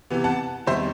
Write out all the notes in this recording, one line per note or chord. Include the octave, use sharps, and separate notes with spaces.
C3 E3 B3
F#5 A5
E2 C3 D#3 G3 C5 E5